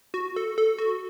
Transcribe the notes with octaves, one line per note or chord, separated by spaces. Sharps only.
F#4
A4
A4
F#4